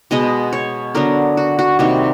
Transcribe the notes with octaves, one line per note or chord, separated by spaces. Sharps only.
B2 G#3 B3 D#5
C#5
D3 F#3 B3 A#4
F#4
F#4
C3 D#3 G3 A#3 F#4